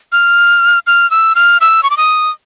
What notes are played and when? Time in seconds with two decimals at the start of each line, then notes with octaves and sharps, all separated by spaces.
0.12 F6
0.87 F6
1.11 E6
1.35 F6
1.61 E6
1.83 C#6
1.90 D6
1.97 D#6